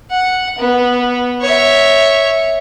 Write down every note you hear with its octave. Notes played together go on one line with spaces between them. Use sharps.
F#5
B3
C#5 E5